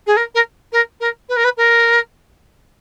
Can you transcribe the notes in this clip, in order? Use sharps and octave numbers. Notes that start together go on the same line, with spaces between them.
G#4
A#4
A#4
A#4
A#4
B4
A#4
B4
A#4